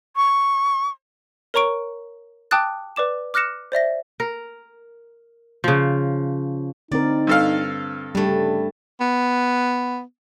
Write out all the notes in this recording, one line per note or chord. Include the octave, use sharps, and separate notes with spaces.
C#6
A#4 C#5 A#5 C#6 D7
G5 A5 D6 D#6 F#6 A6
B4 D5 D6 E7
D6 F6 F#6 A#6 C#7 E7
C5 D5 E5 A#6
A#4
C#3 F3
D3 C4 D#4 A#4 D5
G2 A4 F5
G2 C#3 G3 A3
B3